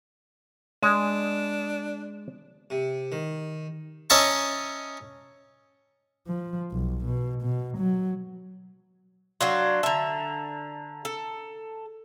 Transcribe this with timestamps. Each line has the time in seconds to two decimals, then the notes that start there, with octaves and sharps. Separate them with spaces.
0.83 G#3 D4
2.70 C3
3.12 D#3
4.10 C#4 D#5 E5 A5 A#5 C#6
6.27 F3
6.72 B1
7.05 B2
7.42 B2
7.77 F#3
9.41 F#3 D4 F#4 D5 F5 C6
9.83 D3 E5 A5 A#5
11.05 A4